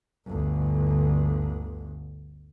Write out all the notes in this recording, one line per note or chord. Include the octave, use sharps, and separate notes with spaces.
G1 D2